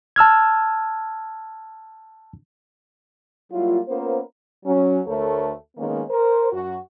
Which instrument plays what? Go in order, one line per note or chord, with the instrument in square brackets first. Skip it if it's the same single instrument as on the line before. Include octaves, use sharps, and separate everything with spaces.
[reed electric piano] A5 E6 F6 G#6
[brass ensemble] F#3 G3 A#3 E4 F4
A#3 B3 C#4 F4 A#4 C5
[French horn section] F#3 C#4
D2 A3 A4 A#4 C#5
D#3 G#3 A#3 B3 C#4
A#4 C5
F#2 F#4